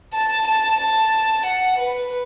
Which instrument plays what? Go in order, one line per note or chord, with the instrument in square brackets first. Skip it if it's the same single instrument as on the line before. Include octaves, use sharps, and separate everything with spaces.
[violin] A5
A5
A5
F#5
B4